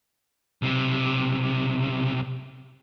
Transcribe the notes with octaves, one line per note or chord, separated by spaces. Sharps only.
B1 C3